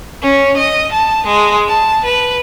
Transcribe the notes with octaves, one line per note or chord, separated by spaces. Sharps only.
C#4
D#5
A5
G#3
A5
B4